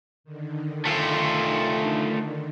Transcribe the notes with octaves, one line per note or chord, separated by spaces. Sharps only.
D3 D#3
A3 F4